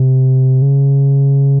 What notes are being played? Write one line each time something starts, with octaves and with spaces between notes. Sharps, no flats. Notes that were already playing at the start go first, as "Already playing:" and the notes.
Already playing: C3
C#3